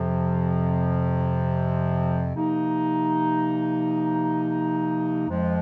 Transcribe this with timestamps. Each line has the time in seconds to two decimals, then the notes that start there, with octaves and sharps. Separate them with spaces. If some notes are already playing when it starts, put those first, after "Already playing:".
Already playing: F2 C3 F3
2.35 C3 F3 A#3 D#4
5.29 F2 F3 G#3